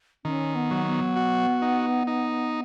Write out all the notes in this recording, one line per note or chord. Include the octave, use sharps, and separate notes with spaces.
D#3 C#4
B3
F#3
B3
F#4
D#4
D#4